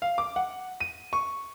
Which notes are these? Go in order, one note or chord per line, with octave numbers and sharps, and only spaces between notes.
F5
D6
F#5
D#7
C#6